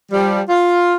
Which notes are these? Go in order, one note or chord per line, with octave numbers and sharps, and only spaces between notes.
F3 G3
F4